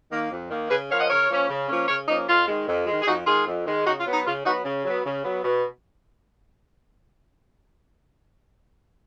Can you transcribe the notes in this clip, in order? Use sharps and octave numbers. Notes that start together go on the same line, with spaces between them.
D#3 A#3
F2
D#3 A#3
C#3 G#4 B4
F3 A#3 C#4 C#5 F5
D#5 F#5
C#3 A#4 C#5
F3 A#3 C#4
C#3
F3 A#3 C#4
C#3 A#4 C#5
F3 A#3 C#4 D#4
F2 F4
D#3 G#3
F2
D#3 G#3
G#4
F2 D#4 F#4
D#3 G#3 F4 G#4
F2
D#3 G#3
C#3 D#4 F#4
F4
F#3 B3
D#4
C#3 F4
F#3 B3 D#4 F#4
C#3
F#3 B3
C#3
F#3 B3
B2